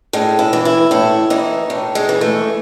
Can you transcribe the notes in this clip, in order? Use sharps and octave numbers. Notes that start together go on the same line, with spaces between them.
A2 G#3
E4
E3
E4
A2 E4
E3 D#4
A2
G#3
E3
A3